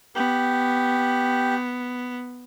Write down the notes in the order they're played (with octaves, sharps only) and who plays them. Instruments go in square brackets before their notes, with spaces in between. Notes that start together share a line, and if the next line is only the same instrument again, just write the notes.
[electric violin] B3 [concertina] G4